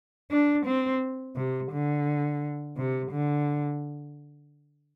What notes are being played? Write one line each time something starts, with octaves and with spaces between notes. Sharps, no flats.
D4
C4
C3
D3
C3
D3